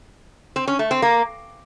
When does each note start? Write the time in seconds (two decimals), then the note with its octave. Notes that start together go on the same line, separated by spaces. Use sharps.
0.56 C4
0.68 C#4
0.79 A3
0.91 C4
1.02 A#3